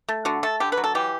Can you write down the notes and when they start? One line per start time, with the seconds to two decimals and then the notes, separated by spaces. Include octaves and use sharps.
0.09 A3
0.25 D3 F#4
0.43 A3 A4
0.60 D3 G4
0.72 B4
0.77 F#3
0.84 A4
0.95 E3 G4